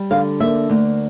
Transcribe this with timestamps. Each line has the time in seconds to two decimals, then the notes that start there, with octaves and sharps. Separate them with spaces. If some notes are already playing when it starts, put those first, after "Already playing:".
Already playing: G3
0.10 D3 F5
0.40 A#3 E5
0.69 D2